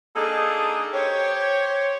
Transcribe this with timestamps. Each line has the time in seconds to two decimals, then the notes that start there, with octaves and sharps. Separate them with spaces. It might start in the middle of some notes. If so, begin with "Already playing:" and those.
0.15 A#3 D4 D#4 G#4 A4
0.94 G4 C5 C#5